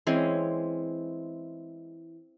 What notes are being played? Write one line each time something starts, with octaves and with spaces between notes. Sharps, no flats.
E3 G#3 C4 C#4